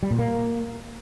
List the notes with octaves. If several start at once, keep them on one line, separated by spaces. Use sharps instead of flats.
G3
A#2
A#3